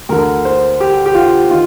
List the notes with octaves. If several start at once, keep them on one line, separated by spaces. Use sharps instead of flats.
D2 D3 A#4
C5
G4
G4
F4
D#3 F4